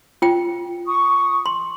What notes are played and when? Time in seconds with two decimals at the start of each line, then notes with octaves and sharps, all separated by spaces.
0.22 F4 G5
0.87 C#6 D#6
1.46 C6